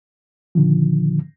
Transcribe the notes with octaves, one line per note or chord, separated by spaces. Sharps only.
A#2 D3 D#3 F3